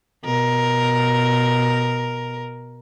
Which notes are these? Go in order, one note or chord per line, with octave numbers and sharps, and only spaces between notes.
B2 A#4